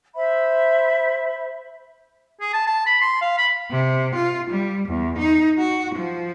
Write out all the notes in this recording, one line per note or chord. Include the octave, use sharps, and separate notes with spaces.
C5 E5 B5
G#4
A5
A5
B5
C6
F5
B5
C3
F4
G3
E2
D#4
F#4
F3